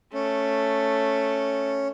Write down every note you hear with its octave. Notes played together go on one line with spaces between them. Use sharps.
A3 C#4